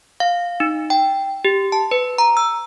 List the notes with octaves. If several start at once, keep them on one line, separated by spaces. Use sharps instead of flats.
F5
D#4
G5
G4
A5
B4
A#5
E6